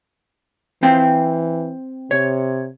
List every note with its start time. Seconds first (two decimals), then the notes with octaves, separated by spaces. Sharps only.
0.83 E3 C4 F5 G5
2.11 C3 C#5